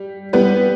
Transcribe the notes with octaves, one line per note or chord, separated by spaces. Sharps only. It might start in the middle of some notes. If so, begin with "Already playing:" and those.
Already playing: G3
G3 B3